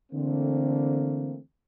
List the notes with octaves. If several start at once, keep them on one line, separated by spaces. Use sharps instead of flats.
D3 E3 A3 A#3 C4